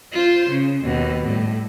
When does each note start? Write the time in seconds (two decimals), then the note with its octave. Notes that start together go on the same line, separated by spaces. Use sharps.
0.12 F4 C5
0.49 C#3
0.84 D#2 B2
1.25 A2 G3